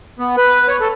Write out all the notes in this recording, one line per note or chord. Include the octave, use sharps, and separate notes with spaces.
B3
B4
C#5
A4